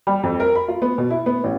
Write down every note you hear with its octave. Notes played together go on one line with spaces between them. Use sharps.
G3
F2
A#4
B5
F4
B3
B2
E4
B3
A1